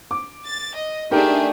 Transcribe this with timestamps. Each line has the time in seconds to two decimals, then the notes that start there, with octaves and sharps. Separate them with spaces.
0.11 D6
0.44 A6
0.75 D#5
1.11 A3 D4 D#4 G4 G#4 A#4